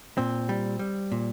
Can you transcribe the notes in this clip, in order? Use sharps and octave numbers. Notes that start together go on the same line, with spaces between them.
A#2 C4
G3
G3
A#2